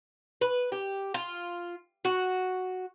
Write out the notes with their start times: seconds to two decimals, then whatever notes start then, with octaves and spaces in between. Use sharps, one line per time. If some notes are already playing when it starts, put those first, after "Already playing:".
0.41 B4
0.72 G4
1.14 F4
2.05 F#4